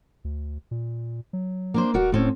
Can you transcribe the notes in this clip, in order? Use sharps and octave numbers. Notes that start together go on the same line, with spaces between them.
D2
A#2
F#3
A#3 D4 C5
D#1 F#4 A#4 D5
A2 C4 C#4